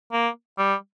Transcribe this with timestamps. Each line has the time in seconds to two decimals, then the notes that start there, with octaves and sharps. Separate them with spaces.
0.12 A#3
0.58 G3